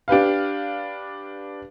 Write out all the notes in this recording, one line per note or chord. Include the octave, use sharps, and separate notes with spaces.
D4 G4 B4 F5